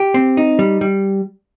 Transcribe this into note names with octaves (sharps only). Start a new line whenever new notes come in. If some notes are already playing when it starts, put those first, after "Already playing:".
Already playing: G4
C4
D#4
G3
G3